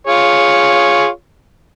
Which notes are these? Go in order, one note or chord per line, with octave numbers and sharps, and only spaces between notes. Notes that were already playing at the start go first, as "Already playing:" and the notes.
F4 G#4 C#5